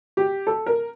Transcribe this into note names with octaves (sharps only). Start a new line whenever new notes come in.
G4
A4
A#4